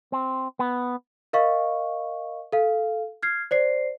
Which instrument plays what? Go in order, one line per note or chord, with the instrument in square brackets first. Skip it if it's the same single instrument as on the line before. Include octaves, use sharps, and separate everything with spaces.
[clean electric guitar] C4
B3
[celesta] A#4 D#5 F5 C#6
A4 F5
F6 G#6 C7
C5 D5 C7